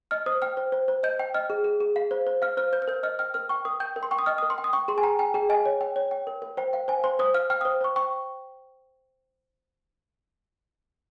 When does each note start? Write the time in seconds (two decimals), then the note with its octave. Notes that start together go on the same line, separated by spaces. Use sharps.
0.11 D#5 F6
0.26 C5 D#6
0.42 G5 F6
0.57 C5
0.72 C5
0.88 C5
1.03 D#5 G6
1.19 G5
1.34 D#5 F6
1.50 G#4
1.64 G#4
1.81 G#4
1.96 F5
2.11 C5
2.27 C5
2.42 F5 F6
2.57 C5 F6
2.73 C5 G6
2.82 F6
2.88 A#4 G6
3.03 D#5 F6
3.19 G5 F6
3.34 A#4 F6
3.49 G5 C#6
3.65 A#4 D#6
3.80 G5 G6
3.96 A#4
4.03 C6
4.11 G5 C#6
4.19 D#6
4.26 D#5 F6
4.38 D#6
4.43 A#4
4.50 C6
4.58 G5
4.64 D#6
4.73 G5 C#6
4.88 G#4 C6
4.98 G#5
5.03 G5 A#5
5.19 G5 G#5
5.34 G#4 G5
5.49 D#5 G#5
5.66 C#5
5.81 G5
5.96 C#5
6.11 G5
6.27 A#4
6.42 A#4
6.57 C5 G5
6.73 F5 G5
6.88 C5 G#5
7.04 C5 C6
7.19 C5 D#6
7.34 F5 F6
7.50 G5 F6
7.61 D#6
7.65 C5
7.81 C5 C#6
7.96 G5 C#6